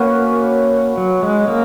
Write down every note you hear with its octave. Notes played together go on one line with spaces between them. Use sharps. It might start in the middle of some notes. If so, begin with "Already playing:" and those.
Already playing: A#3 C#4 F#4 B4
F#3
G#3
A#3